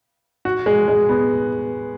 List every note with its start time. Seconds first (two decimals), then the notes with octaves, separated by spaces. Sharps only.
0.45 F#4
0.66 G#3
0.88 G#3
1.09 B3